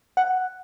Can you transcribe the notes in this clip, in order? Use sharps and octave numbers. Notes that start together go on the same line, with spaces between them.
F#5